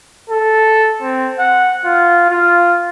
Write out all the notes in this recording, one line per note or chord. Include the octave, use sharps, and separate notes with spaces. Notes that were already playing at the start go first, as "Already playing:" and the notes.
A4
C4
F#5
F4
F4